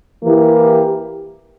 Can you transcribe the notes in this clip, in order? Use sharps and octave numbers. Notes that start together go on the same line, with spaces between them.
E3 A#3 E4 G4